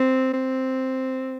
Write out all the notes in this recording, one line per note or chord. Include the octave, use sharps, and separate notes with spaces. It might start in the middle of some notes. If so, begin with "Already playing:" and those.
Already playing: C4
C4